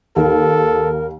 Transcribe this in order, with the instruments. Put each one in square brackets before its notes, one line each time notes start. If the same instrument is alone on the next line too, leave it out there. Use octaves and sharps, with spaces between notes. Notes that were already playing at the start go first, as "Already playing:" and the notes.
[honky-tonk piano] D#2 [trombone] A4 [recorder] A#4